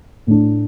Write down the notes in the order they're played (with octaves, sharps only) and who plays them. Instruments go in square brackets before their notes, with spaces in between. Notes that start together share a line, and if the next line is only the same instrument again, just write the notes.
[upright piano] A2 A3 D4